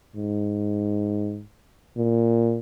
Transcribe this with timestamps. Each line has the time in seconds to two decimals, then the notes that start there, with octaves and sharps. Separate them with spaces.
0.16 G#2
1.97 A#2